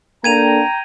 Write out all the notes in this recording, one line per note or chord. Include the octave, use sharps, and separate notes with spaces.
A#3 D4 A4 G5 A#5 G#6 D#7 F7